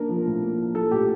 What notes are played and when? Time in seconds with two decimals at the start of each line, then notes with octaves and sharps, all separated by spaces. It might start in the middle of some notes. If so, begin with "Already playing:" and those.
Already playing: A#3 D4 A#4
0.09 F3
0.26 A2
0.42 A#3
0.59 D4
0.75 F3 A4
0.91 A2 G4